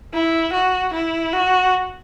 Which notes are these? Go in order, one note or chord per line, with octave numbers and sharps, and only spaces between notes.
E4
F#4
E4
F#4